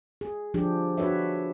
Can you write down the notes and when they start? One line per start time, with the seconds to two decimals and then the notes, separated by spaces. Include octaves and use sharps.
0.21 G#4
0.54 F3 D4 G4 G#4
0.97 D4 F#4 B4 C#5 E5